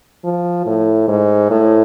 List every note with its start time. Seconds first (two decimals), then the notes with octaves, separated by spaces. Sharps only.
0.24 F3
0.66 A2
1.08 G#2
1.50 A2